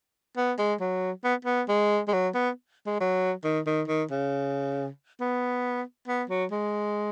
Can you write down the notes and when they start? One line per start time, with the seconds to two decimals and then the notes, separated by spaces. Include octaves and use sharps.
0.37 B3
0.58 G#3
0.80 F#3
1.24 B3
1.45 B3
1.68 G#3
2.08 G#3
2.13 F#3
2.34 B3
2.86 G#3
3.01 F#3
3.44 D#3
3.67 D#3
3.88 D#3
4.11 C#3
5.20 B3
6.08 B3
6.29 F#3
6.51 G#3